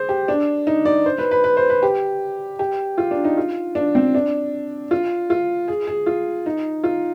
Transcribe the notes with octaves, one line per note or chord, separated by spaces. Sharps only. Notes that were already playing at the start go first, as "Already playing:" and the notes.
Already playing: G#4 C5
G4
D4
D#4
D5
C5
B4
B4
B4
C5
B4
G4
G4
F4
D4
D#4
F4
D4
C4
D4
F4
F4
G#4
G#4
F4
D#4
F4